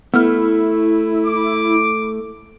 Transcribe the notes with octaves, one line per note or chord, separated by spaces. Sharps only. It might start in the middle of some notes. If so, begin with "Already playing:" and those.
A3 B3 E4 F6
D6